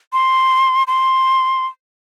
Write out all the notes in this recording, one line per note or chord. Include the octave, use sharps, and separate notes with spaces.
C6
C6